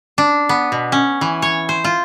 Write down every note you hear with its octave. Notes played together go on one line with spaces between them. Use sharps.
D4
B3
B2
C#4
E3
C#5
C5
F4